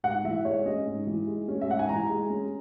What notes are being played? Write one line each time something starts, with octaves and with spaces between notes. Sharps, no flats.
G#2 F#5
E3 E5
G#3 C#5
C#4 D#5
G#2
E3
G#3
C#4
E5
G#2 F#5
G#5
E3 A#5
G#3
C#4